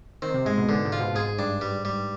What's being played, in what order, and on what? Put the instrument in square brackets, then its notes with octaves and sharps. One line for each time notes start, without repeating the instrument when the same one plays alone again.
[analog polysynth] D#3 [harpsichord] C4
[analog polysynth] C3
[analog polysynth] G#2 [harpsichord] G#3
[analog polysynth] B2
[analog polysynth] G#2 [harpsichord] D3
[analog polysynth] G#2
[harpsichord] F4
[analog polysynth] B2
[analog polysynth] G#2 [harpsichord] G#4
[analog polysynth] G2 [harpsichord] D4
[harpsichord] G3
G3